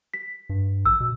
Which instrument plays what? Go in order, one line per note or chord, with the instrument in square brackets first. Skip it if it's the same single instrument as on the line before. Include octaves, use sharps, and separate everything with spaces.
[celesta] B6
[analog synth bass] G2
[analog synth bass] A#1 [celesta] E6
[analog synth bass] B2